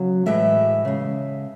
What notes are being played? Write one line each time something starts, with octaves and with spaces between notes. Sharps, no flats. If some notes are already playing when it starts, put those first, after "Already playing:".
Already playing: C#3 F#3
A2 E3 G#3 E5
C#3 G#3